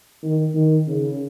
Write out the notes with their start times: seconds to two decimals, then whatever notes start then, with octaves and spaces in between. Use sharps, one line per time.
0.23 D#3
0.54 D#3
0.87 C#3